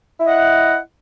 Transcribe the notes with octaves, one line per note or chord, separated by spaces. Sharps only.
E4 D#5 F#5